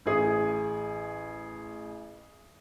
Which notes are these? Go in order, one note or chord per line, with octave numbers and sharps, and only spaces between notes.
A1 G#4 D#6